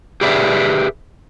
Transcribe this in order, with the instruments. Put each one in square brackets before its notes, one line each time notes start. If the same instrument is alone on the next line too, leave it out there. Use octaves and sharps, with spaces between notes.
[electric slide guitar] G4 G#4 B4 D5 E5